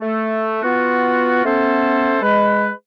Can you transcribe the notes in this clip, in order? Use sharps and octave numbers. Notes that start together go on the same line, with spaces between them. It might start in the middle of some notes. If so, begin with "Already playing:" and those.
A3
B3 F4 F#4
A3 B3 C#4 A4 C5
G#3 B4